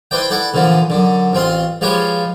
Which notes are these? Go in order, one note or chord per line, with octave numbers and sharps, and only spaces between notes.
E4 B4 C5 D5 G5
E4 A4 D5 F#5
A#2 D3 E3 F3
F#2 D3
A1 C4 F4 C6
F3 G#3 F4 G4 B4 C#5